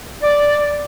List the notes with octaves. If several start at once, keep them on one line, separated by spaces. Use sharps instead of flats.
D5